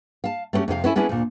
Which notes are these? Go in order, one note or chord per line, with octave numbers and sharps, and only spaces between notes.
F5 A5
A3 B3 C#4 F#4 G4
F2 C3 A4 F5
B3 C#4 E4 A4
B3 C#4 D4 E4 G#4
D2 A#2